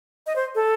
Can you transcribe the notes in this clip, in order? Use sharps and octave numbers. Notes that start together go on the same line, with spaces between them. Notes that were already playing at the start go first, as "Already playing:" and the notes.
D#5
C5
A4